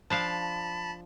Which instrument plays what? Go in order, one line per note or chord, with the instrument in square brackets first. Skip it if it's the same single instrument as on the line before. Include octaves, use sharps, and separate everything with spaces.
[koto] F3 D4 F5 [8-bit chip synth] A5 B5